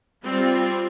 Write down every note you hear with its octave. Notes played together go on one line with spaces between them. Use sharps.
G3 C4 F4